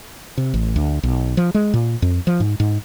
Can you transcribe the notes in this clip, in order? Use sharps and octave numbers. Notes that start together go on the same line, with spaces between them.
C3
A1
D2
B1
F3
G#3
A#2
F2
F3
G#2
G#2